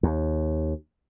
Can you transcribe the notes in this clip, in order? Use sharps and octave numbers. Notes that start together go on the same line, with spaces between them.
D#2